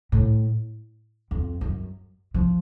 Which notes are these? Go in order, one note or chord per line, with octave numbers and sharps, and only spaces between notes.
A2
F2
F#2
F3